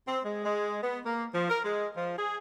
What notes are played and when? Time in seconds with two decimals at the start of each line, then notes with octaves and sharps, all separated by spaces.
0.08 C4
0.24 G#3
0.45 G#3
0.83 B3
1.06 A#3
1.35 F3
1.50 A#4
1.64 G#3
1.97 F3
2.18 G#4